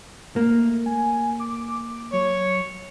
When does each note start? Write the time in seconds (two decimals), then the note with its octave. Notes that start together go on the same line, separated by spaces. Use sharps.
0.36 A3 A#3
0.86 G#5
1.40 D6
2.13 F#3 C#5